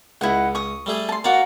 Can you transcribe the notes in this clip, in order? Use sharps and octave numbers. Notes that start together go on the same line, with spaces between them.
C#2 E4 D#5 F#5
C#6 D#6
G3 A3 G#4
A5 C6
A#3 F#4 D5 A#5